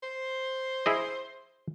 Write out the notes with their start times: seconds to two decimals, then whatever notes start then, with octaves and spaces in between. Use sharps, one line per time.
0.03 C5
0.86 E4 G#4 D#5